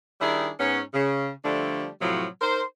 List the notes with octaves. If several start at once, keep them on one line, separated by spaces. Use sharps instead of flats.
D#3 G3 D4 E4 G#4
G#2 B3 C#4
C#3
D3 F3 G3 A3 D4
A2 C3 F3 F#3
D#4 A#4 C5